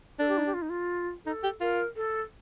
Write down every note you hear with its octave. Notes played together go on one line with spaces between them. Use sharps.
D4 A4
G4
D#4
G4
F4
D#4
F4
D#4 A4
G4
F4 A#4
A4